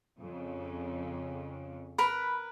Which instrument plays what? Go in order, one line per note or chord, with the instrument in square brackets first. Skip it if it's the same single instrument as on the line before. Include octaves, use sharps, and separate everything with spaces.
[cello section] F2 C#3
[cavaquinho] A#4 B4 [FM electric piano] B5